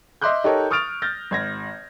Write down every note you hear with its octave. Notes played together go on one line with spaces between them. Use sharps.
D#5 E5 C6 D6 F#6 G6
D#4 G4 A4 A#4 C#5
C#6 D#6 F6 A6 D7 F7
F6 G6 A6 A#6
G#1 G#6 A#6